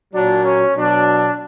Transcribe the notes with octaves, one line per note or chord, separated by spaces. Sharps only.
A#2 F#3 D4
C#4
B2 F#3 D4